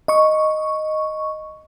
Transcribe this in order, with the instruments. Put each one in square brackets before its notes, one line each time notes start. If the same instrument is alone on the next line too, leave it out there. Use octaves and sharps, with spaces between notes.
[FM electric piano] D#5 C#6